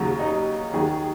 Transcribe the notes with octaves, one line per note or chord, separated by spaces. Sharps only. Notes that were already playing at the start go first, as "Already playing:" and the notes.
Already playing: D#2 C#3 F#3
D#4
D#2 D#3 F#3 G#4